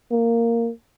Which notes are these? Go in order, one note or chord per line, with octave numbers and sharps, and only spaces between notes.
A#3